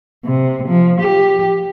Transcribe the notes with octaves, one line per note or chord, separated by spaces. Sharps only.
C3
F3
G4